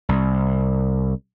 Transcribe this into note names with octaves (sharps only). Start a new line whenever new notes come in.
C2